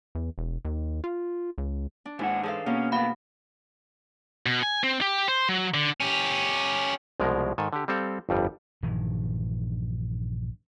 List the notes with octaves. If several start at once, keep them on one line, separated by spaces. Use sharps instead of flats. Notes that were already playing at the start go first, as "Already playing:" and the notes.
E2
E1
D#2
F4
C#2
D4
D#2 G#2 E4 F#5
E3 G#4 A4 F5 A5
B2 A#3 C#4
E2 A2 B3 F5 B5
B2
G#5
C4
G4
C5
F#3
D3
C#4 G4
C2 B2 F3 G#3 A#4
G#2 D#3 A4 G#5
D3 G4
G3 C4 A4 F5
G1 F2 G3
A#1 G2 D#3 E3